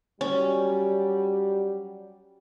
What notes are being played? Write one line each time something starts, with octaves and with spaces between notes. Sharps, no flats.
F#3 G3 C#4